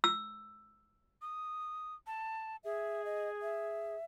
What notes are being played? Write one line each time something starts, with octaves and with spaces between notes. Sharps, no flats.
E6
D#6
A5
G#4 E5
D#5
E5